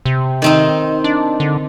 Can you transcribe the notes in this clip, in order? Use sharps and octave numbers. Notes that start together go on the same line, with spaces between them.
C3
D#3 C4 D#4
D4
D3